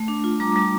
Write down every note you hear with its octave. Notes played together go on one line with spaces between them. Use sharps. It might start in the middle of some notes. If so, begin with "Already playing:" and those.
Already playing: A3
D4
F4
G3 A#5 D6
G3